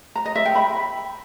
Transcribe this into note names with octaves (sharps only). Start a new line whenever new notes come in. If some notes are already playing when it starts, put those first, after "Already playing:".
A#5
D#5
E5
G5
B5